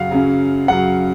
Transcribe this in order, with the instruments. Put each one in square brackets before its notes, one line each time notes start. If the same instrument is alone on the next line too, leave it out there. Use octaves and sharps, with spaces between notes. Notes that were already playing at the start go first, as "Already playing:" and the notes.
Already playing: [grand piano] F#2 C#3 F#3 F5 F#5
F#2 C#3 F#3
F#2 C#3 F#3 F#5